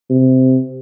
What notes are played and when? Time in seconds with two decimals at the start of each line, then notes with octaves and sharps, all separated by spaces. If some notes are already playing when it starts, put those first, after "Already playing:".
0.10 C3